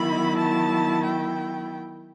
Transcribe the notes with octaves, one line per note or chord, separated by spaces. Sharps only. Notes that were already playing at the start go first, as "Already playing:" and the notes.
Already playing: D#3 F#3 B3 E4 B5
A5
G5